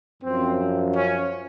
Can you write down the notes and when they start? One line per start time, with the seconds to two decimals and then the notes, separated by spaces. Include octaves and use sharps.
0.23 F#2 F3 C4
0.95 C#4